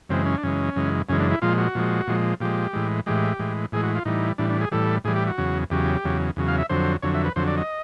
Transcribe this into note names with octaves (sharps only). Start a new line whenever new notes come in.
F#2 C#3 E3 G#3 C4
C#4
D4
F#2 C#3 E3 G#3 C#4
F#2 C#3 E3 G#3
F#2 C#3 E3 G#3 C#4
D4
E4
A#2 F3 G#3 F4
F#4
A#2 F3 G#3
A#2 F3 G#3
A#2 F3 G#3 G4
A2 E3 G#3
A2 E3 G#3 G4
A2 E3 G#3
A2 E3 G#3 G#4
F#4
F4
A2 E3 G3 D#4
A2 E3 G3 D4
D4
G#4
A2 E3 G3 A4
A2 E3 G3 G#4
G4
F#4
E2 C#3 F#3
E2 C#3 F#3 G4
E2 C#3 F#3
E2 C#3 F#3
F5
E5
F2 D3 F#3 C5
F2 D3 F#3 C#5
E5
B4
F2 D3 F#3 C5
D5
D#5